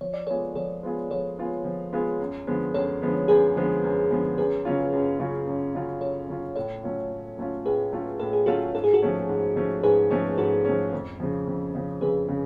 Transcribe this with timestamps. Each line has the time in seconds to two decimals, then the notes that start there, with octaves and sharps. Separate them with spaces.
0.01 F3 C#5
0.14 D5
0.27 G#3 B3 F4 G#4 A4 C#5
0.55 F3 A4 C#5
0.83 G#3 B3 F4 G#4
1.11 F3 A4 C#5
1.38 G#3 B3 F4 G#4
1.65 F3
1.93 G#3 B3 F4 G#4
2.20 F#2
2.47 D3 F3 G#3 B3
2.74 F#2 A4 C#5
3.02 D3 F3 G#3 B3
3.28 F#2 G#4 B4
3.56 D3 F3 G#3 B3
3.84 F#2
4.10 D3 F3 G#3 B3
4.38 F#2 G#4 B4
4.65 C#3 F#3 C#4 F4
4.93 F#2
5.19 C#3 F#3 C#4 F4
5.47 F#2
5.75 C#3 F#3 C#4 F4
6.01 F#2 A4 C#5
6.28 C#3 F#3 C#4 F4
6.56 A2 A4 C#5
6.83 F#3 A3 C#4 F4
7.11 A2
7.38 F#3 A3 C#4 F4
7.65 A2 G#4 B4
7.92 F#3 A3 C#4 F4
8.20 A2 A4
8.33 G#4
8.46 F#3 A3 C#4 F4 F#4 A4
8.74 G#2 A4
8.84 G#4
8.94 F#4 A4
9.02 F3 A3 C#4
9.29 G#2
9.56 F3 A3 C#4
9.83 G#2 G#4 B4
10.10 F3 A3 C#4
10.38 G#2 F#4 A4
10.65 F3 A3 C#4
10.93 F2
11.20 C#3 F3
11.47 F2
11.75 C#3 F3
12.01 F2 G#4 B4
12.28 C#3